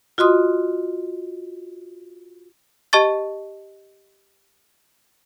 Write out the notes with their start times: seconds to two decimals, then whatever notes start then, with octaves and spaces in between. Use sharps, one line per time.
0.18 F4 F#4 D#5 C6 D#6
2.93 G4 D#5 A5 C#6 A6